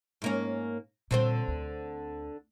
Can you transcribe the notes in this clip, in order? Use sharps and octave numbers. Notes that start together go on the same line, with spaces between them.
G#2 A#3 C#4
A#2 D3 G3 C4 C5
D2